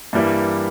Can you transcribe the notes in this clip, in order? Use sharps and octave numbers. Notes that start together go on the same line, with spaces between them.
G2 E3 G3 A#3 E4